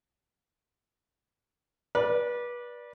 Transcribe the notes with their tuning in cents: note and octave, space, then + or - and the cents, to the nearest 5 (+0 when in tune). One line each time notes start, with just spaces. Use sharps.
B4 -30 D5 +0